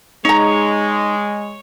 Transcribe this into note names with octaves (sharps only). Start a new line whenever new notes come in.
G#3 D#4 C#5 A#5